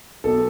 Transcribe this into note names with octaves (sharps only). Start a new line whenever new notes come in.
B1 B2 A4